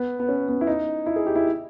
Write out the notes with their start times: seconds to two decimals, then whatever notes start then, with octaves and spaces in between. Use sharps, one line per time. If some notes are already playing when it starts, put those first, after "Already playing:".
Already playing: B3
0.19 B3
0.28 C#4
0.48 B3
0.61 E4
0.67 D#4
1.06 E4
1.16 G#4
1.26 G4
1.35 E4